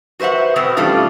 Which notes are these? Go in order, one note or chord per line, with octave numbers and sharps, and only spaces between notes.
F#4 B4 C5 E5 F#5
B2 B3 C4
D#3 G3 A3 C#4 D4 F4